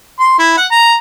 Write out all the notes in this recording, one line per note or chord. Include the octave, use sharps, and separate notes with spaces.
C6
E4
F#5
A#5